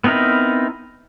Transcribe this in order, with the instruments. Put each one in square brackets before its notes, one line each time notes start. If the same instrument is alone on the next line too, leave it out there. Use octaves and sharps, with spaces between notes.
[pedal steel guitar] B3 C4 D#4 E4 A#4